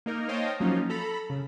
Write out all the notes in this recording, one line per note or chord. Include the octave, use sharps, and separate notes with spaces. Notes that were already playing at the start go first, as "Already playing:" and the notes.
A#3 D#4 A#4
C5 C#5 D#5 F5 G5 A5
F3 F#3 A#3 C#4 D#4 F4
A4 A#5 B5
C#3